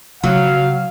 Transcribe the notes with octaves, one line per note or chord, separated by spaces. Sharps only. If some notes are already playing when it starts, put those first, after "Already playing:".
C#3 F#3 F5